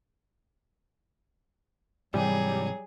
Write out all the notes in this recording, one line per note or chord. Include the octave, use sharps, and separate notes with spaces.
G#2 C3 E3 F#3 G3 G#4